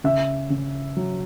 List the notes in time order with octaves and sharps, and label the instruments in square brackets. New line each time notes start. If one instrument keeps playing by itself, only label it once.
[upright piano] C#3 E5
C#3
F#3